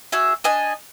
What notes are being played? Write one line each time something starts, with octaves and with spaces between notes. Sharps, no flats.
F#4 G#4 E5
D4 D#5 G#5